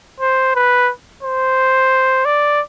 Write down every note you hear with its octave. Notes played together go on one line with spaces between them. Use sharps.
C5
B4
C5
D5